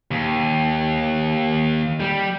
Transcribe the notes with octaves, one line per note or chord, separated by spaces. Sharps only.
D#2
G3